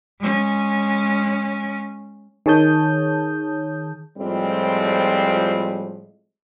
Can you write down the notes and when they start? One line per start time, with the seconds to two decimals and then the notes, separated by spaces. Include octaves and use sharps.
0.20 G#3 C#4
2.46 D#3 G#4 C#5 A5 D#6 G6
4.18 A2 F3 G3 G#3 C4 F4